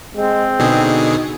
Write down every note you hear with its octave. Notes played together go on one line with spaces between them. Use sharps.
G#3 C4
B2 D3 D#4 G#4